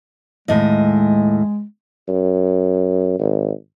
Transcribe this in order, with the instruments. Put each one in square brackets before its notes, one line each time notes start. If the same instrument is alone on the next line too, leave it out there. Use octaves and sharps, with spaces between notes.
[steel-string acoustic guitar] D#2 A2 D#5 [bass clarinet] G#3
[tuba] F#2
G#1